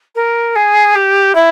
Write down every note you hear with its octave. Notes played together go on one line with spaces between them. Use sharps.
A#4
G#4
G4
E4